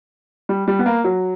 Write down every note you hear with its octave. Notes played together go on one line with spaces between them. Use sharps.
G3
G3
B3
A#3
F#3